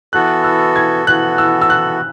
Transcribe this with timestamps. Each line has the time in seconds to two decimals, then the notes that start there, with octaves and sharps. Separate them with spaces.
0.13 E3 B3 F#4 A4 F#6
0.44 E6
0.76 G#6
1.07 E3 B3 F#4 A4 F#6
1.38 E6
1.61 E6
1.70 F#6